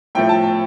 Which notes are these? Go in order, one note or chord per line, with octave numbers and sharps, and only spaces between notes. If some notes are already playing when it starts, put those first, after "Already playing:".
A2 F3 A3 G5
A5
G5